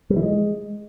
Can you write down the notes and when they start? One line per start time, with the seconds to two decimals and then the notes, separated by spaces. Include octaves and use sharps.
0.10 G3
0.16 E3
0.23 G#3